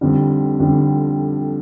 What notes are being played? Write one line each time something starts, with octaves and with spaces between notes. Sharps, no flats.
F2 D3 G3
F2 D3 G3